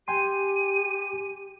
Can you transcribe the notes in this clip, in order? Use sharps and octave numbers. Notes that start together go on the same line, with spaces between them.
G4 G5 G#5 C6 D#7